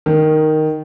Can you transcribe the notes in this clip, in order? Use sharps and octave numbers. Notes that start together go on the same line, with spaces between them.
D#3